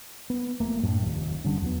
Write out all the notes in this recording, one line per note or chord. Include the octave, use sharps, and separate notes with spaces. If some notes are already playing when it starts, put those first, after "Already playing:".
B3
F1 A3 A#3
F#2 A2 D4
F1 D#2
F#1 D3 G3 C#4
E2 F#3 B3